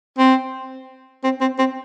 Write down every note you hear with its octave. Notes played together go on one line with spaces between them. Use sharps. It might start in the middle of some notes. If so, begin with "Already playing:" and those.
C4
C4
C4
C4